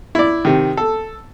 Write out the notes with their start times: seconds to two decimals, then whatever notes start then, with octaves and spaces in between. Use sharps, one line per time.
0.15 E4 D5
0.45 C3 D#3
0.77 A4